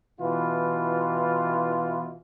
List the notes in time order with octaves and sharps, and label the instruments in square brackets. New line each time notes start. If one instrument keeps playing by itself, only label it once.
[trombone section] B2 E3 E4 F4